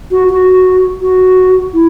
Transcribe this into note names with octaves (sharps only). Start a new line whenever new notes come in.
F#4
F#4
F#4
E4